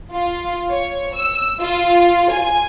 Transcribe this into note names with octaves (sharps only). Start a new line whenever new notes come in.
F4
C#5
E6
F4
G#5